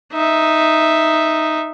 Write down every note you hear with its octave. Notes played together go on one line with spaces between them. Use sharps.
D#4 E5